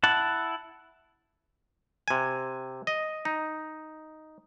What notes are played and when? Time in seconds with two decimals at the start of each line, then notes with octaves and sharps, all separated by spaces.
0.04 E4 F#5 A5
2.08 C3 G#5
2.87 D#5
3.25 D#4